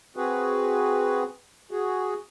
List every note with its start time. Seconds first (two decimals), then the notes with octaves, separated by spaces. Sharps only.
0.17 C4 F#4 G#4 B4
1.71 F#4 G#4